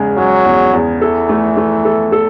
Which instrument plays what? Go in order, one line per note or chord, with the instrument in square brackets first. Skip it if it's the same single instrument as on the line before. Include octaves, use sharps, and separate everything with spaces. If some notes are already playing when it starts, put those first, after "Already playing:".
Already playing: [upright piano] E2 C#3 G#3
[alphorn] F#3 [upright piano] G#3
[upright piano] E2
E2
[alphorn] E3 [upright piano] A4
[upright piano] A3
A3
A4
A4